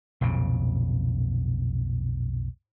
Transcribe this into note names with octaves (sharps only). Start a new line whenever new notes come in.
B1 F2 A#2 C#3